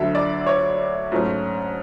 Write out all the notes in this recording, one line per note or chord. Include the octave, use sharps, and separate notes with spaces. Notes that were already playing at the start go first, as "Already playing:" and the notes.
Already playing: D2 D3 F#3 E5
D5
C#5
G#2 F#3 A3 C#4